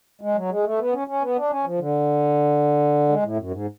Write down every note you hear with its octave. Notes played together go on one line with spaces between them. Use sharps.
G#3
F#3
G#3
A3
B3
C#4
C#4
B3
D4
C#4
F3
D3
G#3
A2
F#2
G#2